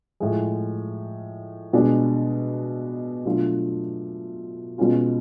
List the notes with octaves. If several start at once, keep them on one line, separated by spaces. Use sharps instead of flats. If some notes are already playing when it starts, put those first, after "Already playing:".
A2 F3 G#3
B2 G#3 D4
B2 F#3 A3 D4 F4
B2 G#3 C#4 F4